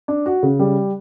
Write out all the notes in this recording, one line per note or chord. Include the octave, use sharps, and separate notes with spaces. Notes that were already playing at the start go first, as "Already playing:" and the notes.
D4
F#4
C#3
G3